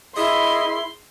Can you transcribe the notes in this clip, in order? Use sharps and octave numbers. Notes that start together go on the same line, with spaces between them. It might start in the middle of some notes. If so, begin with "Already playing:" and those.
E4 G#4 D#5 C6